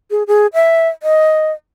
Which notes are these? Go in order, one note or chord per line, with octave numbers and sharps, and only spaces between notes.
G#4
G#4
E5
D#5